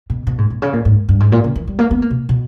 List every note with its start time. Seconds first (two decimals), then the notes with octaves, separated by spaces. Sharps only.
0.10 B2
0.27 B2
0.38 G#2
0.50 B2
0.62 C#3
0.73 A#2
0.85 G#2
1.09 G2
1.20 G#2
1.32 A#2
1.44 C#3
1.56 E3
1.67 G3
1.79 A#3
1.91 B3
2.02 A#3
2.11 B2
2.29 B2